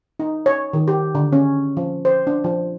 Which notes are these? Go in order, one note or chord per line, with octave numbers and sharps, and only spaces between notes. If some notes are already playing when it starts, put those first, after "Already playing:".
D#4
C#5
D#3
G4
D3
C#4
F3
C5
D4
F3